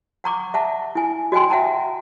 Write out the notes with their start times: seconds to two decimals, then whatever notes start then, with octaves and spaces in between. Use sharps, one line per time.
0.24 F#5 A#5 C#6 D6
0.54 E5 F#5 A5
0.95 E4 G#5
1.32 F#4 D#5 G5 G#5 C6
1.50 E5 F#5 G5 A5 A#5